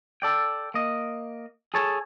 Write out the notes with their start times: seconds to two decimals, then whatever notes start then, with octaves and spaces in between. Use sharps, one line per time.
0.22 A4 D5 G5
0.74 A#3 D#5
1.74 G#4 A4 C#5 A5